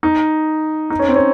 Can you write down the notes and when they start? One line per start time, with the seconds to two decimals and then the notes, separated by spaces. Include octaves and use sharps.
0.03 D#4
0.90 D#4
0.99 C#4
1.08 C4
1.16 C#4